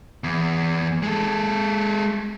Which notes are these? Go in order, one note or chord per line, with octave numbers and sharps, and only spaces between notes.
E2
G#3 A4